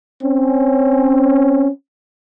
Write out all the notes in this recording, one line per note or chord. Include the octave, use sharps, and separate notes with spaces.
C4 C#4